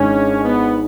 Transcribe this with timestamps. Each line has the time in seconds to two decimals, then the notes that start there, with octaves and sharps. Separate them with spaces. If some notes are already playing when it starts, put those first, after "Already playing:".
Already playing: G#1 G#2 G#3 C#4 D4
0.44 B3